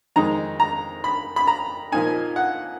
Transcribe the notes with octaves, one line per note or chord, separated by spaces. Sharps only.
F2 D#3 G#3 D#4 A#5
A#5
B5
B5
A#5
A#2 F3 A#3 D#4 G#5
F#5